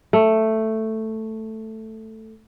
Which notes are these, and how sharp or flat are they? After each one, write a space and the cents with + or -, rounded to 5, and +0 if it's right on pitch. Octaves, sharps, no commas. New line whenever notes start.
A3 +5